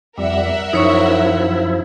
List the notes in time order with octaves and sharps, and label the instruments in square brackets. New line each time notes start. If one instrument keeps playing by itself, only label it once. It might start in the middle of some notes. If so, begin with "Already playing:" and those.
[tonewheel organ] F2 G3 [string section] A#4 E5 F#5
[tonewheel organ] F#2 F3 E4 [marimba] D#4 C#5 C#6